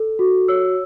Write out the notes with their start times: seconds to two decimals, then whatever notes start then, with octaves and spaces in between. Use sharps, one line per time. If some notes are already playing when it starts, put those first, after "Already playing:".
Already playing: A4
0.19 F#4
0.48 C#5 E6